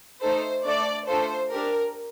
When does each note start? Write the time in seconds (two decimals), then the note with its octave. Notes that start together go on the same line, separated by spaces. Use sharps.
0.22 A3 D#4 A4 C5
0.65 A3 D4 A4 D5
1.08 A3 D4 F4 A4 C5
1.51 D4 G4 A#4